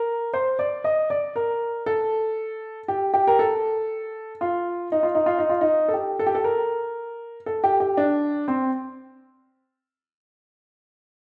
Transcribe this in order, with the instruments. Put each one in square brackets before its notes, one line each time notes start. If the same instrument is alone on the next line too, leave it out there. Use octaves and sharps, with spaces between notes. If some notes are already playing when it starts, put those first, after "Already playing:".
Already playing: [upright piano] A#4
C5
D5
D#5
D5
A#4
A4
G4
G4
A#4
A4
F4
D#4
F4
D#4
F4
D#4
F4
D#4
A4
G4
A4
G4
A4
A#4
A4
G4
G4
D4
C4